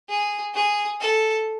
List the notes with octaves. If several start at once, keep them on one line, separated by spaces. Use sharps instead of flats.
G#4
G#4
A4